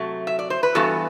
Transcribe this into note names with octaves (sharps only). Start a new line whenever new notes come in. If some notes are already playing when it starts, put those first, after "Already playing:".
Already playing: C3 F#3 A3
E5
D5
C5
B4
G2 E3 B3 F#4 A4